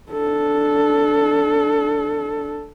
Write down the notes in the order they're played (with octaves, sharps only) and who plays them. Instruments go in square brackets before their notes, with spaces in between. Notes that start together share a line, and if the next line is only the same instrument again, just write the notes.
[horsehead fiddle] D4 A4